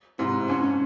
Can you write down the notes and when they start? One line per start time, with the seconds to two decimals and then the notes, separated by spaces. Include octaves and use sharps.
0.19 G#2 C3 E4
0.49 F2 G#2 C#4